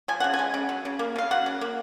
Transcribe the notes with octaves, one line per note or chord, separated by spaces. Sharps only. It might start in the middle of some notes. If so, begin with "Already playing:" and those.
F3 G#5
C#3 F#5
G#5
G#3
C#3
F#3
C#3
A#3
C#3 F5
F#3 F#5
C#3
A#3